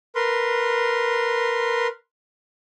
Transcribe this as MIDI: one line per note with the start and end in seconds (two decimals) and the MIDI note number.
0.15 1.87 70
0.15 1.87 71
0.15 1.87 84